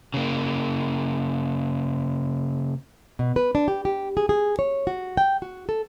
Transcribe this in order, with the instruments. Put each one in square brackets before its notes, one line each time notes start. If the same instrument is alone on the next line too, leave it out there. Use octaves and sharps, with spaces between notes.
[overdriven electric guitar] C#3 A#3
[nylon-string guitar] B2
B4
D4
G4
G4
G#4
G#4
C#5
F#4
G5
F#4
A4